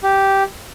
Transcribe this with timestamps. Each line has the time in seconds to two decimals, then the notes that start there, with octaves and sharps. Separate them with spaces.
0.03 G4